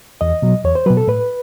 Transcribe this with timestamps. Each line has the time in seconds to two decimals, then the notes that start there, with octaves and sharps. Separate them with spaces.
0.21 E2 D#5
0.42 B2 F#3
0.64 E2 C#5
0.75 C5
0.86 B2 F#3 B4
0.97 A4
1.08 A2 B4